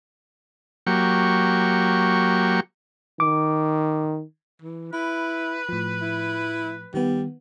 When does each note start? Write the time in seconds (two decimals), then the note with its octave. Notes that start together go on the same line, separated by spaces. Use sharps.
0.87 F#3 A#3 G4 C#6
3.20 D#3 D6
4.62 E3
4.93 E4 B4
5.69 A2 F3
6.02 E4
6.94 D#3 G3 B3